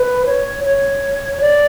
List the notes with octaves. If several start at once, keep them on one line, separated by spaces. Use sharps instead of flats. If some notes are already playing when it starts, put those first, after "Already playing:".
Already playing: B4
C#5
C#5
D5